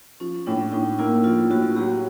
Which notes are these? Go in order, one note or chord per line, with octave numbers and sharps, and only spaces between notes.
F3 C#4
A2 D4
A2 D#4
A#3 E4
F3 F4
A2 F#4
F#3 G4